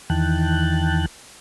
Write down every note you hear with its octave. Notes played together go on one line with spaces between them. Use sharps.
E2 D#3 E3 G5 A5 F#6